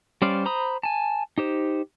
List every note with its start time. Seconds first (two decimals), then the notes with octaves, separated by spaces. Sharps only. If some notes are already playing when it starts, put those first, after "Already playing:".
0.22 G3 C#4 C5 D5 F5
0.45 C5 A#5 B5 D#6
0.83 G#5 A5
1.38 D#4 G4 C5